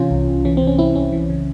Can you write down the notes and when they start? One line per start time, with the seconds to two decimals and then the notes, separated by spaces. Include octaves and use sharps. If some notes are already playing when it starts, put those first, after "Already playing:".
Already playing: C3 E3 C#4 F4
0.11 C2
0.28 C2
0.45 E3 C#4
0.57 C3 C4
0.67 C#4
0.78 C2 C4 E4
0.95 C2 C#4
1.12 E3
1.30 C#3